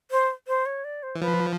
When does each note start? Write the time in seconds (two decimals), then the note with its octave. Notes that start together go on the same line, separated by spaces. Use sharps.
0.11 C5
0.48 C5
0.66 C#5
0.84 D5
1.03 C5
1.15 E3
1.21 F3 B4